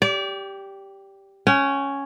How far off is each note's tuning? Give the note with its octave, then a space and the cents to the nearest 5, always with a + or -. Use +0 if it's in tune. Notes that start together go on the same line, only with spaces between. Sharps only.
G4 +0 D5 -30
C#4 +0 G5 -45